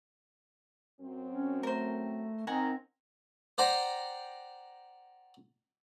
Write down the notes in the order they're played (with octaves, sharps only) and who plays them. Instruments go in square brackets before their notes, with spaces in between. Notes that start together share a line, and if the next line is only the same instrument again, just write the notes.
[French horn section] F#2 C4
[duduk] C#4
[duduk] A3 [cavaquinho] A#4 C5
[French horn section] D#3 [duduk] C4 [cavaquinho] F#5 G#5 A#5
[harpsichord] C5 D5 F#5 G5 A#5 C6